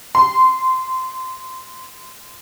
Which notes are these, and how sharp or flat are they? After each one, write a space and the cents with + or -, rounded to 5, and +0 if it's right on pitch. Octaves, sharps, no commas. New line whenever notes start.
C6 -15